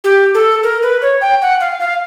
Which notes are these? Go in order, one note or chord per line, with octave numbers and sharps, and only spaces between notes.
G4
A4
A#4
B4
C#5
G5
F#5
F5
F5